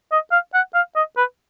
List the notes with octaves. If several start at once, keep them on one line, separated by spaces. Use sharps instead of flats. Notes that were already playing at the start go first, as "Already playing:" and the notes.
D#5
F5
F#5
F5
D#5
B4